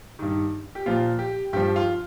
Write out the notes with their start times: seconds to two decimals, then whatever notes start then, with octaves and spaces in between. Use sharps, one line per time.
0.19 G2 D#3
0.75 G4
0.86 A#2 F3 F4
1.19 G4
1.53 G2 F3 G4
1.76 F4